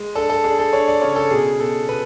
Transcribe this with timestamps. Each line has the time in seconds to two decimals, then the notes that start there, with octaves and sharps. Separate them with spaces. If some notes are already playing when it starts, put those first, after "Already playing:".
Already playing: G#3
0.15 D4 A4
0.29 A4
0.44 D4 G#4
0.59 A4
0.73 D4 C#5
0.88 D5
1.02 C#3 C#5
1.16 A4
1.30 B2 G#4
1.60 B2 A4
1.89 B2 B4